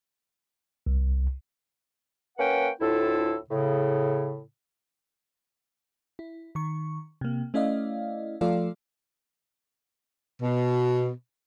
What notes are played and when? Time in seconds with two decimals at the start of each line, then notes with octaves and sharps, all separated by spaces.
0.87 C2
2.38 A#3 C#4 B4 F#5 G5
2.81 D2 A2 E4 F4 A4
3.50 A2 C#3
6.19 E4
6.55 D#3 C#6
7.21 C3 A#3
7.54 A3 C#4 E4 D5 D#5 F5
8.41 F3 A3 F4 A4 D5 F5
10.41 B2